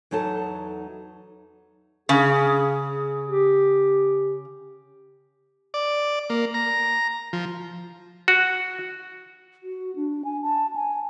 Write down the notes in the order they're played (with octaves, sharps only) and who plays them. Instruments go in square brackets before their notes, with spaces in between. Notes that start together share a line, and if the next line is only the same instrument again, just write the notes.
[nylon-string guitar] E2 F#3 D#4 A4 A5
[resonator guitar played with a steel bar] C#3 [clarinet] G#4
[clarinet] G4
[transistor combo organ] D5
A#3
A#5
F3
[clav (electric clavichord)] F#4
[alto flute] F#4
D4
G#5
A5
G#5